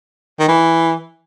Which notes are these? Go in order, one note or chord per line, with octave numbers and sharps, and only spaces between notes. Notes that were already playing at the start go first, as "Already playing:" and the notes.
D#3
E3